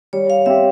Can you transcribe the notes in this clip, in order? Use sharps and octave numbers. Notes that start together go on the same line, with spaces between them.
G3 C#5
F5
C4 G4 E5